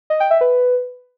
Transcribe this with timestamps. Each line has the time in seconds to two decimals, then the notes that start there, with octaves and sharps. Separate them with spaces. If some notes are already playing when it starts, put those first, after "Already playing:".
0.10 D#5
0.20 G5
0.31 E5
0.41 B4